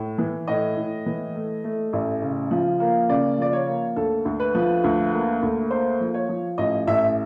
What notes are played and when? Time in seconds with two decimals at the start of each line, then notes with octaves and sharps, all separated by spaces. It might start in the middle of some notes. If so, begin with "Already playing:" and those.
Already playing: A2
0.18 E3
0.48 A2 D#5
0.77 A2
1.06 E3
1.35 A3
1.64 A3
1.93 A1
2.22 C#3
2.51 F3
2.80 A#3
3.09 C#3 D5
3.38 F3 D5
3.53 C#5
3.67 A#3
3.96 D2 A4
4.25 D2
4.40 B4
4.55 F3
4.84 D2
5.12 A#3
5.42 D2
5.71 A#3 C5
6.01 F3
6.14 C#5
6.29 F3
6.58 A1 D#5
6.87 A1 E5